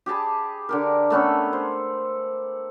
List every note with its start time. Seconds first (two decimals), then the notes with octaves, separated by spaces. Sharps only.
0.06 G4 G#4 A5 B5
0.69 D3 G4 A#4
1.10 A3 B3 C#4 A4
1.53 C5